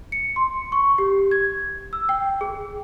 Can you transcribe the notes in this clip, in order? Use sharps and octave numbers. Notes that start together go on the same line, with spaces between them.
C#7
C6
C#6
G4
G#6
E6
G5
G#4